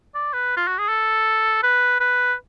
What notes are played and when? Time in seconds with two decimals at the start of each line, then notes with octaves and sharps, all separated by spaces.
0.15 D5
0.33 B4
0.57 F4
0.68 F#4
0.78 G#4
0.89 A4
1.63 B4
2.00 B4